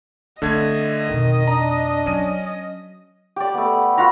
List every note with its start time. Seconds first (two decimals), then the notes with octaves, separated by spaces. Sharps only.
0.42 D3 A3 C4 C#4 D#5 G#6
1.08 F2 B2 D#3
1.48 D4 A#5
2.06 F#3 C#4 D#7
3.36 G4 D5
3.54 A3 B3
3.97 F4 F#4 A#5 B5